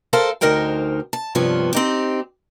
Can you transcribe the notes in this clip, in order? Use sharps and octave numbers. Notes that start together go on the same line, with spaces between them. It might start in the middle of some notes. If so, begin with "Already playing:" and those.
A4 A#4 C5 F5 A5
D2 D#4 A#4 C5 G5
A5
G2 C3 F3 B3 C#5
C4 D#4 G4